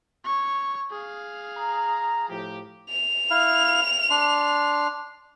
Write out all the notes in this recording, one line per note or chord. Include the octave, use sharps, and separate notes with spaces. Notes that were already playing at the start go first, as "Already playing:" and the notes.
C#5 C#6
G#4 F5
A#5
A2 F3 G4
F7
E4 F5
D4 C6